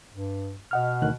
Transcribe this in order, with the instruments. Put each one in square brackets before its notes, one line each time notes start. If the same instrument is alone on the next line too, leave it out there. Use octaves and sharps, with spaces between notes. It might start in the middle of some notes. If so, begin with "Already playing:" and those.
[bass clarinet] G2
[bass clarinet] B2 [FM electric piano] D#5 F#5 F6
[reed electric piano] D2 D#3 F#6